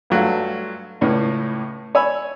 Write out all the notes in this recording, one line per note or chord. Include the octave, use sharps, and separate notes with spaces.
G2 F#3 A3 F4
C#2 A2 C#4
C#5 G#5 B5 E6